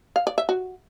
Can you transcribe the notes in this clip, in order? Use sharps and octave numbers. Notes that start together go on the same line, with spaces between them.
F5
D5
E5
F#4